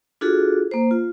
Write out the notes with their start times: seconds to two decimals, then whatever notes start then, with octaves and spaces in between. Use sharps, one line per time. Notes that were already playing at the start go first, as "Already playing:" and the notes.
0.21 D4 F4 F#4 G#4 A4
0.71 A#3 C5
0.91 F4